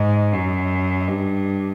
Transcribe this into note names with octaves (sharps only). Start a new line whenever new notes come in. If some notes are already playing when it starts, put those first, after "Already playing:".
Already playing: G#2
F#2
G2